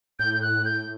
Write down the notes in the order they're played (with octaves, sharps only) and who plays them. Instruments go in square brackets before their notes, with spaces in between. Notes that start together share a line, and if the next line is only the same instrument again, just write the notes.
[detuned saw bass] A2 [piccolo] G6
[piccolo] G6
F#6
G6